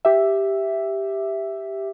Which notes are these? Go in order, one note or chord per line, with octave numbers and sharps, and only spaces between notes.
G4 E5